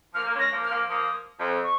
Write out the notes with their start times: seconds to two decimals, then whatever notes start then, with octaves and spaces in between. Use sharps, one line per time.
0.14 F3 A#3 F6
0.26 A#3
0.33 G#3 C#4
0.39 A#6
0.52 F3 A#3
0.64 F6
0.70 F3 A#3
0.90 F3 A#3 D#6
1.39 F2
1.64 C#6